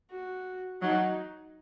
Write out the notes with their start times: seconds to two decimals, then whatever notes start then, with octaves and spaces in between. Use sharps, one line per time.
0.11 F#4
0.82 F#3 D#4